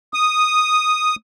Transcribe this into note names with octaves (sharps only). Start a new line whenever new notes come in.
D#6